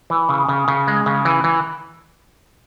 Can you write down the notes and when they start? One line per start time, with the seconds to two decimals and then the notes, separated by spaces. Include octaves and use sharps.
0.10 E3
0.29 C#3
0.48 C#3
0.68 C#3
0.88 G#3
1.06 C#3
1.25 E3
1.44 E3